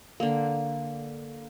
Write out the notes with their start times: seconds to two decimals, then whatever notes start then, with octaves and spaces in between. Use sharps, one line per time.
0.20 D3 A#3